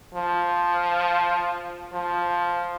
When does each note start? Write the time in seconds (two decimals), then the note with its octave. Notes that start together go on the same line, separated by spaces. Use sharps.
0.15 F3
1.93 F3